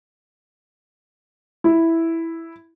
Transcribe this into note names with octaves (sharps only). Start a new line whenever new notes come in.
E4